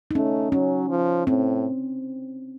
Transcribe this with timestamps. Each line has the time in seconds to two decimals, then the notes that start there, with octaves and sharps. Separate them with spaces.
0.11 D#4
0.15 A3 C#4
0.52 F#3 C#4
0.90 F3
1.27 A2 C4